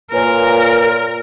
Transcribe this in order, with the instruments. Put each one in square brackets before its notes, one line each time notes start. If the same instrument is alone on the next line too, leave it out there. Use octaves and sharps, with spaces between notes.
[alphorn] A#2 [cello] A#4 [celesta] B4 C#5 G#5